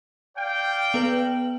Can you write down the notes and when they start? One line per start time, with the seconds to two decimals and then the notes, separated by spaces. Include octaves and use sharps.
0.37 D5 F5 G5
0.94 B3 B4 F#7